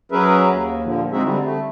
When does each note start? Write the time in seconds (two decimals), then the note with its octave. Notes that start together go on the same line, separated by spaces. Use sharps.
0.12 F#3 C#4 G#4 A#4 B4 E5
0.50 D#2
0.84 A#2 D3 F3
1.12 G#3 C4 D#4 F#4 G#4 E5
1.24 D3 G3 C4
1.43 A3